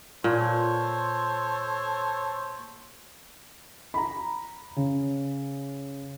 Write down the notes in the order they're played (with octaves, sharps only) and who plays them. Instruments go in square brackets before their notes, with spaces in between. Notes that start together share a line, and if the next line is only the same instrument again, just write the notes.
[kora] A#2 [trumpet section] A4 C5 C#5
[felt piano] A#5 B5
C#3